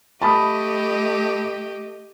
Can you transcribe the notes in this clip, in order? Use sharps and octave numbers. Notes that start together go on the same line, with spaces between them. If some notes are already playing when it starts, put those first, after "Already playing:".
A3 G4 D#5 A5 B5 D#6